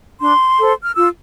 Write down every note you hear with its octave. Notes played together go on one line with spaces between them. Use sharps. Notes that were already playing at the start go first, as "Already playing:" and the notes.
D4 C6
A4 C5
F6
F4 E6